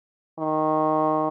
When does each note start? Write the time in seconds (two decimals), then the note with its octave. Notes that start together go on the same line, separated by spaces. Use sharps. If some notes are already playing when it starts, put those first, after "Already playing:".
0.39 D#3